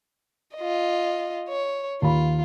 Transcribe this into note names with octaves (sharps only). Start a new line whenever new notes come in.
F4 D#5
C#5
D#2 F4 B5